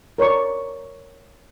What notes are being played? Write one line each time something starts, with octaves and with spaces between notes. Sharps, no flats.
A#4 C#5 D5 C#6